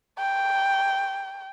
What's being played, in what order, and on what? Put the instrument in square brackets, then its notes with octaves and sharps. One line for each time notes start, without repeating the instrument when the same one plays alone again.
[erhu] G5